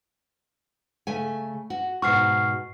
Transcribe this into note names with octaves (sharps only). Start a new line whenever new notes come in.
C#3 A3 G#5
F#4
G#2 B2 F#4 C#6 F6 C7